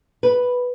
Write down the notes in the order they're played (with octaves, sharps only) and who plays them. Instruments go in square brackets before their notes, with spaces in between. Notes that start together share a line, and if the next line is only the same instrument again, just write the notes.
[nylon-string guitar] B4